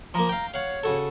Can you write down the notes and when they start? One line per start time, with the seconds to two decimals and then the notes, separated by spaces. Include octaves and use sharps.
0.14 F3 A#3 A#5
0.29 F5 G5
0.54 C#5 F5 F#5
0.83 C#3 F#4 A4